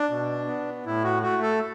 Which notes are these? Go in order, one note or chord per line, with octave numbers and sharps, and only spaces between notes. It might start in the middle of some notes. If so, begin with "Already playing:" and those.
Already playing: D4
B2
B3
A2 E4
F#4
A3 F#4
A4